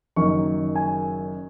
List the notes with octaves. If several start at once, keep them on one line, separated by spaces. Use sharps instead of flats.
F#1 F#2 D#3 C#6
G#5